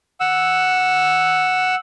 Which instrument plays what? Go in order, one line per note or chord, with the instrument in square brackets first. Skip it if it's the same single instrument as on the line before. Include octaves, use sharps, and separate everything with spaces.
[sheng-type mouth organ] F#5 E6